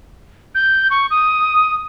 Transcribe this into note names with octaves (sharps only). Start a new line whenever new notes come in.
G6
C#6
D#6